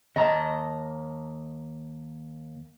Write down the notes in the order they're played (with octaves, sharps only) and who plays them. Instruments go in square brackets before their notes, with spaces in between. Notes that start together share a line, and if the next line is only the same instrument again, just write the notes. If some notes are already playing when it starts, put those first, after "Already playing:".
[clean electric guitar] D#2 A#5 [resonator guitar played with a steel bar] D#5 A5